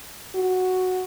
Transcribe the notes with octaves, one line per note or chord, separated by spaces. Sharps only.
F#4